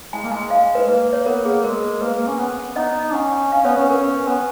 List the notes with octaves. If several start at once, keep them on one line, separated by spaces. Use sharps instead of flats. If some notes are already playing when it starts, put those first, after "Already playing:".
G#3 G#5
A#3
G#3 G#5
F5
B4
A#3 B4
C#5
B3 A#4
A#3 G#4
G#3 A#4
A#3 B4
A#3
C#4
B3
D#4 D#5
C#4 F#5
C#4 F5
B3 C#5
C#4 B4
C#4 A#4
B3 B4